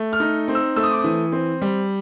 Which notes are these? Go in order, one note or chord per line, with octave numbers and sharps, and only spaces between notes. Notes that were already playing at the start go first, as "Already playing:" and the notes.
Already playing: A3
F6
D#4
C4
E6
A3 E6
D#6
D6
D#6
E3
C4
G3